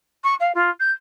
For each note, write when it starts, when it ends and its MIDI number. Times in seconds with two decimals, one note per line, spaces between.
0.24 0.35 85
0.40 0.52 77
0.55 0.70 65
0.80 0.91 91